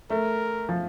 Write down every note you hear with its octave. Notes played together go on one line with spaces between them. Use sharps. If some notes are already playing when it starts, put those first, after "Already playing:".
A3 A#4
F3